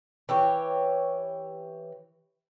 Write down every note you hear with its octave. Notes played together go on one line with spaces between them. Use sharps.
E3 G4 C#5